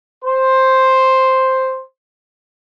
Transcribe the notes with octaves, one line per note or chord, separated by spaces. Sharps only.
C5 C6